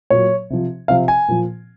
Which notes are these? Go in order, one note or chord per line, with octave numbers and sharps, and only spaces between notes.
A#2 F#3 C#5
C3 F3
C3 F3 F5
G#5
A#2 F3